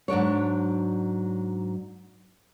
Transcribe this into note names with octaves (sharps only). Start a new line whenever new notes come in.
G#2 F#3 D4 C#5